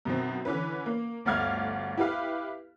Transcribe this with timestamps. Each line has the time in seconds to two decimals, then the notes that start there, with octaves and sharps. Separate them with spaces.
0.05 F#2 B2 D#3 C4
0.45 D3 E3 C#4 B4
0.86 A#3
1.25 G1 D2 D5 F5 F6 G#6
1.98 E4 G4 B4 F5